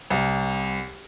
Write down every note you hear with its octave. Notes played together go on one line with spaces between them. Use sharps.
C2